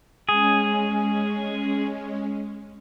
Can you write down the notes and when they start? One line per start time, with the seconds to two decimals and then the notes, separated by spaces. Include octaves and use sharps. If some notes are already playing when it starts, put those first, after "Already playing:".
0.29 G#3 C#4 G#4